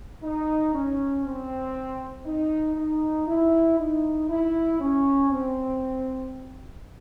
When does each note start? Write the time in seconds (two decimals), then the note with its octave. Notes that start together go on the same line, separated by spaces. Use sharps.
0.23 D#4
0.74 C#4
1.25 C4
2.26 D#4
2.77 D#4
3.28 E4
3.79 D#4
4.29 E4
4.80 C#4
5.31 C4